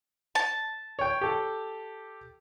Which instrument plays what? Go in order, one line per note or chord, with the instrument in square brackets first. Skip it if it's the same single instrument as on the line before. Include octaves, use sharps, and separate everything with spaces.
[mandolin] A5
[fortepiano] C#5 G5
G4 A4